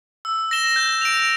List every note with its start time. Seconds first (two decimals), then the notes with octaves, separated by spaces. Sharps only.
0.25 E6
0.51 A#6 E7 G7
0.76 G6
1.01 D7 F7